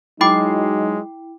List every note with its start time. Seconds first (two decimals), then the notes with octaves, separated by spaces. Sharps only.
0.21 F#3 G#3 D#4 E4 G5 B5 D6